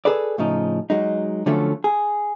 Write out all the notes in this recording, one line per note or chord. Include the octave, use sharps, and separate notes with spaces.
G#4 A4 B4 D5
A2 C#3 F3 D#4
F#3 G#3 D#4
D3 F3 F#3 A3 C#4
G#4